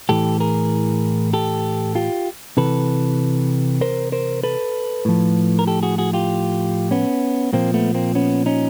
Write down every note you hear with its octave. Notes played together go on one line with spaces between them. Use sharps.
A2 E3 G4 A4
G#4 A#4
G4 A4
F4 G4
C3 E3 A4 B4
A#4 C5
A#4 C5
A4 B4
A2 F3
A#4
G4 A4
F#4 G#4
F#4 G#4
F4 G4
B3 C#4
A#2 F3 A#3 C4
A3 B3
A#3 C4
B3 C#4
C#4 D#4